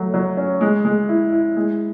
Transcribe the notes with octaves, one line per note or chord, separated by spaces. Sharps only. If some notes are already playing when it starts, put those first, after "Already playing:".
Already playing: F#3 A3
F#3
C#4
G#3
G#3
E4
E4
G#3